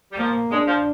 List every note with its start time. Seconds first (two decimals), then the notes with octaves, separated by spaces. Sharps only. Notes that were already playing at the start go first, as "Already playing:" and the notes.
0.12 G3
0.18 F3 A#3
0.51 G#3 D4
0.67 F3